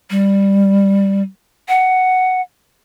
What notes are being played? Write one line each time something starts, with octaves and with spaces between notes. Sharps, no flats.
G3
F#5